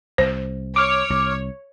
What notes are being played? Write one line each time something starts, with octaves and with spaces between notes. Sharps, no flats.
C2 C5
C#5 D6 F6
C2